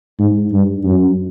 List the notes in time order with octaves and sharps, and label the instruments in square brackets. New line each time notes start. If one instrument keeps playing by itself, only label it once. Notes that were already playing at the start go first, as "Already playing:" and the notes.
[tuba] G#2
G2
F#2